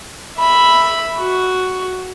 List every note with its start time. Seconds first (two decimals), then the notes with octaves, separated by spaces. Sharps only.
0.37 E5 B5
1.18 F#4